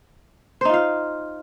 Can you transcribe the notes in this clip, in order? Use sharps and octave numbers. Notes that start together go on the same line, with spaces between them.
D#4 F4 C5 F5